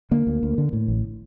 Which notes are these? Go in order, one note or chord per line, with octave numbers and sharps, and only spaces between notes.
D3 A#3
D2
D2
D3
A2
A1